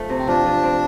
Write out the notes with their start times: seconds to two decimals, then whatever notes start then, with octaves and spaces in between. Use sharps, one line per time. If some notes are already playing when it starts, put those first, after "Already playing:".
Already playing: F3 A3
0.09 C3
0.19 C4
0.27 F3 D4
0.45 F3
0.63 C4